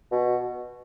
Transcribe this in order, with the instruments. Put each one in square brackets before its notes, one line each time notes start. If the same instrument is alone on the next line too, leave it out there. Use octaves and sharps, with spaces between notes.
[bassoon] B2